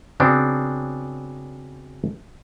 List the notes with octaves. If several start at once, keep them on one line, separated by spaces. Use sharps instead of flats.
C#3 F#3 B3 C4 D4